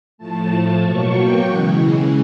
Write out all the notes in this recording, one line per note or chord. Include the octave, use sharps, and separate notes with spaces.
A2 F3 A3 A5
B2 F#3 A#3 C#6
G5
C#3 E3 G#3 F#5